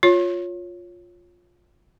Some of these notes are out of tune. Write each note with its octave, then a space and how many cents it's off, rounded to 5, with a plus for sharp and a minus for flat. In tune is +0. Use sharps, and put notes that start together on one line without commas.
F4 +10 C#5 +0